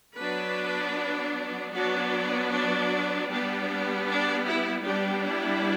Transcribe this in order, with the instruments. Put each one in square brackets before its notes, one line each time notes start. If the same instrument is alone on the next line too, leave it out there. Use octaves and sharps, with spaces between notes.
[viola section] F#3 B3 D4 B4
F#3 B3 D4 F#4
D4
G3 B3 D4
D4
E4
G3 B3 D4 G4
E4